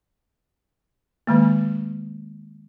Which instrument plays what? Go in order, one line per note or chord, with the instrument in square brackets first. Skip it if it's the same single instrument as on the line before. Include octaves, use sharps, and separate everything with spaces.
[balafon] D#3 G#3 A#3